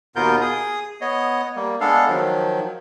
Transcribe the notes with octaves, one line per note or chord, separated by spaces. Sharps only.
D#2 B2 B3 F4 A#4 G6
G#4 D#6
B3 C#5 D#5
G3 A#3
G#3 B3 D4 A4 F5
D#3 F3 F#3